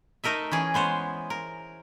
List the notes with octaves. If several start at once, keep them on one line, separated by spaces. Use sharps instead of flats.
A3 D#4 A#4 D#5 E5
E3 C#4 G#4
G#3 B3 C5 C#5
A#4